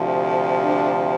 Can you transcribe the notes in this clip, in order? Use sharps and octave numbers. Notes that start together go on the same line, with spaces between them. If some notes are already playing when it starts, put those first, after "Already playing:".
Already playing: D2 C3 F3
D4